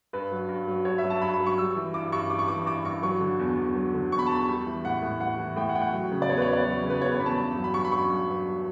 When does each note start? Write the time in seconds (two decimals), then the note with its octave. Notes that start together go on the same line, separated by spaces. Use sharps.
0.13 G2 B4
0.31 F#3
0.49 G2
0.68 F#3
0.85 G2 C#5
0.98 E5
1.04 F#3
1.10 A5
1.22 G2 B5
1.34 B5
1.40 F#3
1.46 C#6
1.58 G3 E6
1.76 E3
1.94 G2 D6
2.12 G2 C#6
2.30 G3 D6
2.39 C#6
2.48 E3 D6
2.66 G2 D6
2.85 G2 C#6
3.03 F#3 C#6
3.21 D3
3.39 E2
3.57 E2
3.75 F#3
3.94 D3
4.12 E2 C#6
4.19 B5
4.27 A5
4.30 E2
4.35 B5
4.49 G3
4.66 E3
4.84 A2 F#5
5.02 A2
5.20 G3 F#5
5.39 E3
5.56 A2 G5
5.69 F#5
5.75 A2 G5
5.82 F#5
5.93 F#3
6.12 C#3
6.22 D5
6.29 E2 C#5
6.38 B4
6.42 C#5
6.48 E2
6.53 D5
6.65 F#3
6.83 C#3
6.90 B4
7.01 E2 C#5
7.14 C#5
7.20 E2 B5
7.26 A5
7.38 G2
7.56 F#3
7.64 B5
7.74 G2 C#6
7.85 B5
7.92 F#3 C#6
8.10 G2
8.28 F#3